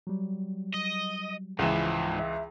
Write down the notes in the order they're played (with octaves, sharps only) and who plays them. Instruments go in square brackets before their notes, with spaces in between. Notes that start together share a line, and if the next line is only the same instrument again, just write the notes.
[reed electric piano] F#3 G3
[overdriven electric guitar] D#5
[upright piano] C#2 E3 [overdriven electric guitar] G#2 F3
[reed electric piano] E5